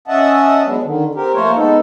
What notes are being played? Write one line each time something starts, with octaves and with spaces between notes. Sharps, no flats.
C#4 D#5 E5 F#5 A5
F#3 G#3 B3 D4
D3 D#3
C4 G4 A#4
F3 A3 A#3 A#4 C5 C#5
G#3 B3 D#4 A4